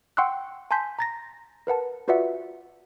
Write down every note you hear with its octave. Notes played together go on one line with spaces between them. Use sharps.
F#5 G5 C6 C#6 E6 F#6
G#5 A5 C6 G6 B6
A#5 A6 A#6
A#4 B4 F#5 A5
F4 F#4 B4 D5 E5 F#5